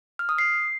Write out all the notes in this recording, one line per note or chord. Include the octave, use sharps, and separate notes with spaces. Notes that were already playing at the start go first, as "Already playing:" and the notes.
F6
D#6
C7